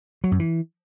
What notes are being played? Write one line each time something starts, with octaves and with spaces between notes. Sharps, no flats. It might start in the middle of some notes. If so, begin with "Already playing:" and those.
F#3
F#2
E3